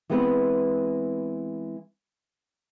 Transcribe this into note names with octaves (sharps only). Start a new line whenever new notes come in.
E3 G#3 B3 C4 B4